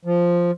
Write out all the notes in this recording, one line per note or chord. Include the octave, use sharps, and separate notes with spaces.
F3